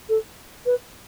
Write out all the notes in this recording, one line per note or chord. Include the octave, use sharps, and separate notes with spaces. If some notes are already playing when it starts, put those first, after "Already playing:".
A4
B4